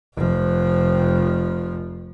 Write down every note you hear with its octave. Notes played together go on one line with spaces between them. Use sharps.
F1 F3